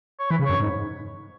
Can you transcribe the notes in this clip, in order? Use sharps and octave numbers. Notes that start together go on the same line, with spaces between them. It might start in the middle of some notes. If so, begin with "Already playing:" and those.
C#5
E3 B4
C#3
F#2 C#5
G#2